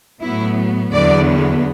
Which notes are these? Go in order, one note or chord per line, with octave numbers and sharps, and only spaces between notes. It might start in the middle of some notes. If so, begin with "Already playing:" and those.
A2 F#3 B3 E4
E2 D3 F#3 B3 D5